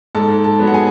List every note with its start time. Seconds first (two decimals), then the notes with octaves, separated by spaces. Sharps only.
0.15 G#2 A4 A5
0.44 A4 A5
0.59 F#3 B3
0.67 F#5
0.74 G#4 G#5